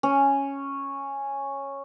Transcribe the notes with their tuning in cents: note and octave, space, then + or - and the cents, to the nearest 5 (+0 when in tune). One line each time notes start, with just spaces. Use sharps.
C#4 -5